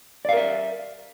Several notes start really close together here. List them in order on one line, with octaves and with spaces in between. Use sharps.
D5 F5 A#4 E5